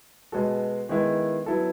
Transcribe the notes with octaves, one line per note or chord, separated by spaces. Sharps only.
B2 G#3 B3 F#4 A4
D#3 G#3 B3 E4
F#3 B3 E4 A4